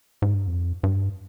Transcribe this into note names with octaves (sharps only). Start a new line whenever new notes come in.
G#2
G2
F2
G2